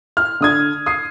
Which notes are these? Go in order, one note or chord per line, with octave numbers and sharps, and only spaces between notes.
F6
D3 D#6 G#6
D#6 C7